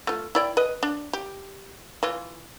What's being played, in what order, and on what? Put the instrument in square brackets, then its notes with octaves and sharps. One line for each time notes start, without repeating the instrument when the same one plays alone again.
[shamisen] A3 F4
E4 D5 G5
B4 D#5
D4
G4
E3 F4